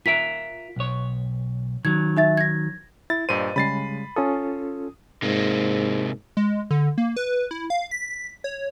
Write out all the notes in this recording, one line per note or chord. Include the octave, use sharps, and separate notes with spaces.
F4 A#4 E5 B6 D7
B1 C#5
D#3 F#3 G#6
D#4 E5 A6
G#6 A#6
E4 A6
G2 A#2 C5 D#5 D#7
C#3 G3 G#3 B5 A6 C7
C#4 F4 A4 D#6
G#2 C3 A#3
G#3
D3
A#3
B4
E4
F5
B6
C#5